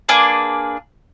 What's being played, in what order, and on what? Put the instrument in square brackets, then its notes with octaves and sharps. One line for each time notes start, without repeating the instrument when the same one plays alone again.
[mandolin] A#3 D4 G#4 B4